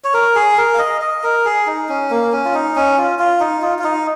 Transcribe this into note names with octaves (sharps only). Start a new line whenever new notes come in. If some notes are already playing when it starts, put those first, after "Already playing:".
C#5
A#4
G#4
A#4
F5
D#5
D#5
A#4
G#4
D#4
C#4
A#3
C#4
F4
D#4
C#4
F4
F4
D#4
F4
F4
D#4